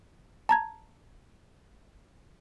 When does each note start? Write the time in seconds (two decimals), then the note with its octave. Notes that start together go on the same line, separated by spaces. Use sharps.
0.49 A5 A#5 G#6